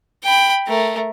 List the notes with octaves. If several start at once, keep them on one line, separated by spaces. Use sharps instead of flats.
G5 B5
A3 A#4